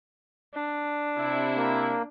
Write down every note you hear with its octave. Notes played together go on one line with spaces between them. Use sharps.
D4
C3 E4
A#3